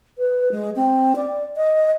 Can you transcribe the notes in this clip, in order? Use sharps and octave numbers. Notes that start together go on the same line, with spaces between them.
B4
G#3
C4
D5
D#5